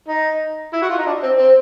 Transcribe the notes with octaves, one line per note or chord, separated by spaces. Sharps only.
D#4
E4
F#4
F4
D#4
D4
C4
C4